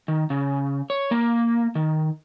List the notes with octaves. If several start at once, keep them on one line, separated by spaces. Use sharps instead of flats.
D#3
C#3
C#5
A#3
D#3